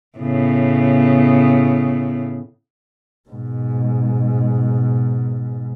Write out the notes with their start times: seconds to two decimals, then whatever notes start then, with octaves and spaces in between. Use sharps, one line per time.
0.18 A2 C#3 B3
3.29 G#2 B2